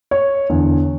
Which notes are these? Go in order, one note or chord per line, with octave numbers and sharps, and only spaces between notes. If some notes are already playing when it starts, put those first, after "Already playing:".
C#5
E2 D3